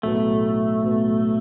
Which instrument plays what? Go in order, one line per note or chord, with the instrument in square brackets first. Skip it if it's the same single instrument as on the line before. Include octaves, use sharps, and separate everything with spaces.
[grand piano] B1 A2 F#3 B3 [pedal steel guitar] A3
[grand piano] B1 A2 F#3 B3